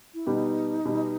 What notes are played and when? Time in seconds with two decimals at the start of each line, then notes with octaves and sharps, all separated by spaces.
0.14 E4
0.26 B2 G3 B3 D#4 G4
0.85 B2 G3 B3 G4